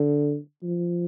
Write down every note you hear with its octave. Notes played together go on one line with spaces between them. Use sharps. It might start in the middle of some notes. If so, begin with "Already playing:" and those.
Already playing: D3
F3